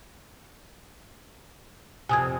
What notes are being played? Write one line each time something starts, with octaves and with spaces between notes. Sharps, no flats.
F2 C3 G#5 D#6 G#6